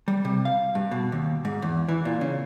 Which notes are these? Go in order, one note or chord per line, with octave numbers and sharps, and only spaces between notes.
G3
C3
F5
G2
B2
D#2
G#2
E2
E3
A#2
C#3